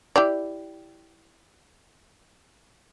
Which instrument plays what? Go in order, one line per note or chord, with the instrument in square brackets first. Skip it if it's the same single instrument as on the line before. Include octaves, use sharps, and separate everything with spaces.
[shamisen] E4 G4 D5